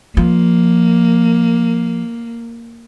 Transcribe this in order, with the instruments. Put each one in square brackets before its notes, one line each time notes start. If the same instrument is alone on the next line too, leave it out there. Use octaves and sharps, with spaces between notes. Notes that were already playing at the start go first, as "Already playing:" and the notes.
[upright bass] F3 [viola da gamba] A#3